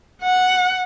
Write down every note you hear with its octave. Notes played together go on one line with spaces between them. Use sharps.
F#5